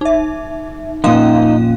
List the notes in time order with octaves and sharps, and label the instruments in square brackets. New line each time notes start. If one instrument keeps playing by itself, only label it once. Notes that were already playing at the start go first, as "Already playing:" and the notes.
[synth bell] D#4 E5
[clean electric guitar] F2 A#2 [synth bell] C#4 F5 [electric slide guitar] D#4